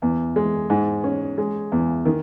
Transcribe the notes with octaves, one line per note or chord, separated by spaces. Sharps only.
E2
G#3
G#2
C#4
G#3
E2
D#3